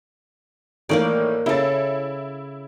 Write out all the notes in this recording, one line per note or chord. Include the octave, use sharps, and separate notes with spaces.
A2 D#3 E3 A#3 A#4 D5
C#3 E4 A4 A6